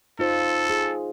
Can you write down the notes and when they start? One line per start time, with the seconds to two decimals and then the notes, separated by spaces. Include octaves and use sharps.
0.19 D#4 F4 A4 C5
0.70 G#4